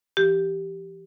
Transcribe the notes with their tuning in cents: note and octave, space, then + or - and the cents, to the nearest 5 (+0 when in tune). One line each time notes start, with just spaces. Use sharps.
E3 +45 G4 -5